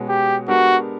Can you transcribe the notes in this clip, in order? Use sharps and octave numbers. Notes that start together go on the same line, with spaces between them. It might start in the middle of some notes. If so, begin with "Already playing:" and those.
Already playing: B2 G#3 C#4 F#4 B4
G4
G#3 B3 D4 F#4 G4 A#4